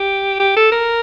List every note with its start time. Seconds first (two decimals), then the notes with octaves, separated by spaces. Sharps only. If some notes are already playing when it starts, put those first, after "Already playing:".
Already playing: G4
0.40 G4
0.56 A4
0.72 A#4